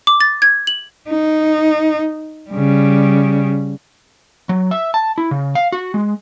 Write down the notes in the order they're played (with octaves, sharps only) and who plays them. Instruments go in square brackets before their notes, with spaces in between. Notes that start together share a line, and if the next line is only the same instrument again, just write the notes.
[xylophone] D6
A6
G#6
F#7
[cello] D#4
C#3 G3
[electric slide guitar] F#3
E5
A5
E4
C#3
F5
F#4
G#3